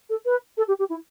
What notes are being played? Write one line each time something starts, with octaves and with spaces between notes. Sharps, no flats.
A4
B4
A4
G4
G4
E4